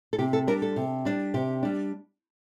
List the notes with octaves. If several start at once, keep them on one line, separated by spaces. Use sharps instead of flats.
A4
C3 G4
A4
G3 D4 A#4
A4
C3
G3 D4
C3 G4
G3 D4